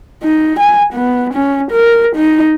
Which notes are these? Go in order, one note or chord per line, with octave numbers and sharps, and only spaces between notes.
D#4
G#5
B3
C#4
A#4
D#4